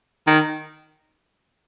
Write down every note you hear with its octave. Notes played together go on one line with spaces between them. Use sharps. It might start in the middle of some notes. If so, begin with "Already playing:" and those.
D#3